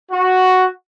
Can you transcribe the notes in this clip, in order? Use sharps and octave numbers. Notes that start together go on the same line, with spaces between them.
F#4